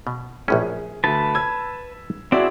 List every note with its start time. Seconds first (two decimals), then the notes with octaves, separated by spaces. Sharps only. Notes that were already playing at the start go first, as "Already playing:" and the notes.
0.07 B2
0.48 A#1 A2 C#4 G#4
1.04 D2 B4 A5
1.35 E6 G#6
2.32 C4 E4 F#4 G#4 D5 E5